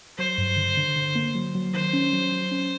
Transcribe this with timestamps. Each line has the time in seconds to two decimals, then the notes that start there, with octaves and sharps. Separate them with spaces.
0.18 F#3 C5
0.38 G2
0.57 D3
0.77 D3
0.96 D3
1.15 A#3
1.35 F#3
1.55 F#3
1.74 D#3 C5
1.93 C#4
2.13 F#3
2.32 F#3
2.51 C#4